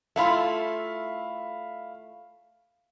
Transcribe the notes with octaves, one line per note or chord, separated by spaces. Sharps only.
A3 E4 F4 E5 F5 B5